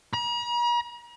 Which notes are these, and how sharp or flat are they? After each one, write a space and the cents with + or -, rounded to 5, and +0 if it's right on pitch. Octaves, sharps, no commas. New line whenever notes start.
A#5 +45